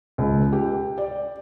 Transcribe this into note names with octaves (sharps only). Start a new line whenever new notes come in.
C#2
G4
D5